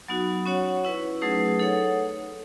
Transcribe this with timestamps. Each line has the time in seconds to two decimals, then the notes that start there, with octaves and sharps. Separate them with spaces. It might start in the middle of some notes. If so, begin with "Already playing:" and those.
0.08 F#3 B3 D#4 F#4
0.46 C#4 F#4 C#5 F#5
0.84 C#4 E4 B4
1.21 F#3 A3 D#4 G#4 B4
1.59 D#4 A4 C#5 F#5